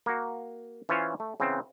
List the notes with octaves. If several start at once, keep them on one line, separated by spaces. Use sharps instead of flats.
A#3 F#4
E3 C#4 F4 C5 C#5
A3
C#3 E3 B3 C4